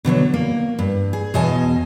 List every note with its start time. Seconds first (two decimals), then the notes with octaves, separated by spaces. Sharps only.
0.05 B2 D3 F3 F#3
0.34 A#3
0.79 G2
1.13 G#4
1.34 E2 B2 D#5 G#5 A5